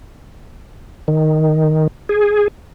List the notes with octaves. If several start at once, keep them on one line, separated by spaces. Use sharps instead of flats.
D#3
G#4